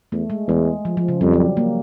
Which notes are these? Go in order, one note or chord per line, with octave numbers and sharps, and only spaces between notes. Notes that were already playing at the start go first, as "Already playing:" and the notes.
E2 A3
G#3
E2 G#3
F3
F3
C#3
F2 G3
F#3
A#3